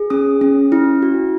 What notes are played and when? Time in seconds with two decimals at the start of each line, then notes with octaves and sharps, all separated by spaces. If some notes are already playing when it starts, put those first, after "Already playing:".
Already playing: G#4
0.10 C#4 D#6
0.41 C#4
0.72 E4
1.02 F#4